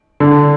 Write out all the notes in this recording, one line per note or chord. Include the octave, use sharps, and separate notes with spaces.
D3